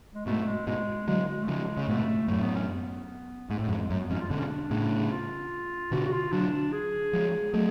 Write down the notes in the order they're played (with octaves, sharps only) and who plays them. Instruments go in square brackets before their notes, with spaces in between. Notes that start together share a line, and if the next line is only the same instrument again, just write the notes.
[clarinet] G#3
[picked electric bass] G#2 B2 [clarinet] A3
[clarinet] G#3
[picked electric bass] G#2 B2 [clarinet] G#3
[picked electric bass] D3 F#3 [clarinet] G#3
[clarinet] G#3
A3
[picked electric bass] C#3 F3 [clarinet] G#3
[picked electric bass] C#3
[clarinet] G#3
[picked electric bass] G#2 B2 [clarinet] A3
[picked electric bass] F#2 A2 [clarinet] A3
[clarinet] B3
C#4
B3
[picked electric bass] G#2 [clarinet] A3
[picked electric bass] A2 [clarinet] G#3
[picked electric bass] F2 G#2
[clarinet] G#3
[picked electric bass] F#2 [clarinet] A3
[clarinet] B3
[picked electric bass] F2 G#2 [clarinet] C#4
[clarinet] F4
[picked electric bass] B2 D3 [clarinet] D4
[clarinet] C#4
D4
[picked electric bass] A2 C#3
[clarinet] F4
[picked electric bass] B2 D3 [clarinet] F#4
[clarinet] F#4
F4
[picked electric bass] D3 F#3 [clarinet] D4
[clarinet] G#4
[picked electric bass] F3 G#3
[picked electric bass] F#3 A3 [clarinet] G#4